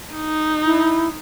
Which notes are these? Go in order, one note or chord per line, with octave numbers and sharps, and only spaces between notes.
D#4
E4